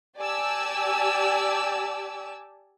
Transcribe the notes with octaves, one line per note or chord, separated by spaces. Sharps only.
G4 D5 G#5 A5 D6 E6